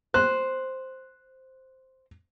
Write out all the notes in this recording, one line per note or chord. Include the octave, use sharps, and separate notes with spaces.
C5 F#6